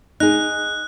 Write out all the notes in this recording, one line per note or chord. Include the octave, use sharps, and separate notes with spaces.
D#4 G#4 F#6